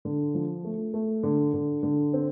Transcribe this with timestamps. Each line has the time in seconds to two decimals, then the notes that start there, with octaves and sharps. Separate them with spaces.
0.05 D3
0.35 F3
0.64 A3
0.94 A3
1.23 D3
1.54 D3
1.83 D3
2.13 C4